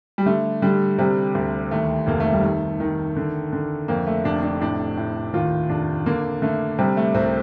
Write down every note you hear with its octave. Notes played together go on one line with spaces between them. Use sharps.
G3
D3 A3
D3 G3
C3 G3
D2
D#2 A3
F1 A#3
A3
G3
D#3 A3
D#3
D3
D3
F2 A#3
A3
F1 D4
D4
A2 D4
A2
D#2 F4
F1 D4
D3 A#3
D3 A3
C3 G3
A3
C2 C4